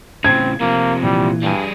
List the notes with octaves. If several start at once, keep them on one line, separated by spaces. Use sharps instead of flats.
A2 C#3 C4 G#6
C3 F3 A#3
A#2 E3 G3
G2 G3 G#4